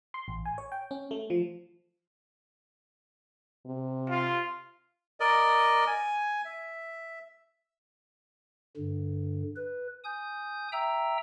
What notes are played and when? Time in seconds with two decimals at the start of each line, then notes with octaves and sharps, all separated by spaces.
0.14 C6
0.28 A1
0.45 G#5
0.58 C#5
0.72 G5
0.91 C#4
1.11 A3
1.30 F3
3.66 C3
4.10 F4
5.20 A#4 D5 D#5
5.87 G#5
6.45 E5
8.77 G2 D3
9.56 B4
10.04 G#5 D#6 G6
10.72 E5 G5 A#5 E6